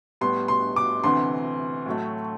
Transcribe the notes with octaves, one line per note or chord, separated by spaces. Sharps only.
A2 G3 B3 C6
C6
D6
D2 C3 E3 C6
A2 F#3 A3